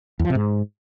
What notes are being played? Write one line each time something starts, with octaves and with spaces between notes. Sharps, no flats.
E2
F3
C3
G#2